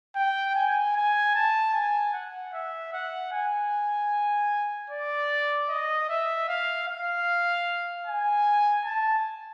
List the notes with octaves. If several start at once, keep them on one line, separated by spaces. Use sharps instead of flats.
G5
G#5
G#5
A5
G#5
F#5
E5
F#5
G#5
D5
D#5
E5
F5
F5
G#5
A5